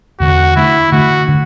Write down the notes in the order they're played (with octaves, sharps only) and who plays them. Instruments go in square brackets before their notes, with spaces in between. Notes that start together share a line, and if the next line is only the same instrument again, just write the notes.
[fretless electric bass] E2 D3 G#3 [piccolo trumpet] F#4
[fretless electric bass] D3 A3 D4 [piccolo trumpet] E4
[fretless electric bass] D3 A3 D4 [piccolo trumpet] F#4
[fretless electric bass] D3 A3 D4